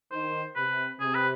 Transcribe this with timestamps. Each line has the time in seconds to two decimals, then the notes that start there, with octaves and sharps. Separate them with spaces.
0.12 D#3 C5
0.56 C3 B4
1.01 C3 G#4
1.15 B4